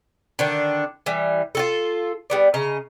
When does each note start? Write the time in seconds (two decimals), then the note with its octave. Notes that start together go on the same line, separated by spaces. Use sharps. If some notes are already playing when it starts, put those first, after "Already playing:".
0.39 D3 D#3 D4
1.06 E3 G3
1.55 F4 F#4 A4
2.30 G3 B3 D5
2.54 C#3 D#5 A#5